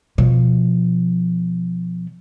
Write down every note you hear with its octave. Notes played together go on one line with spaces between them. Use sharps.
B2 F3